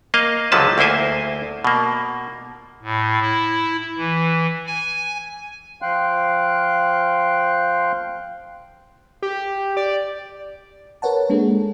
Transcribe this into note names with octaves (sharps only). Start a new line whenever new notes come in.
A#3 D#5 F5
C#2 D3 F3 F#3 B4 A5
D2 A#3 E4 C5 G#5
B2 A#3
A2
E4
E3
G#5
F3 F5 G5 C6 F#6
G4
D5
A#4 B4 C#5 F#5 A5
G#3 A#3 D4 G#4 A4